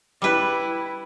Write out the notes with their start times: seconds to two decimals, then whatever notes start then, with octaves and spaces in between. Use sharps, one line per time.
0.22 G3 E4 B4